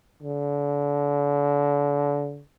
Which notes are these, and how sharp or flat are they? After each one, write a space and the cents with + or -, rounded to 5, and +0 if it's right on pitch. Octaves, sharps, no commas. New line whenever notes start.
D3 -35